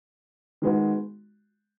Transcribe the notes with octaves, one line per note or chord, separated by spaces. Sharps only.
D#3 G#3 B3 F#4